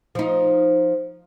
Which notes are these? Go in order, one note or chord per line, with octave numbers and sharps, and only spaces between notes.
F3 D#4